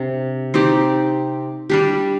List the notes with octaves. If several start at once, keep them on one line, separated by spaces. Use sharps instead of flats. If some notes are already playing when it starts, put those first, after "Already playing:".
Already playing: C3 D4
C4 D#4 G4 D5
G3 D4 G4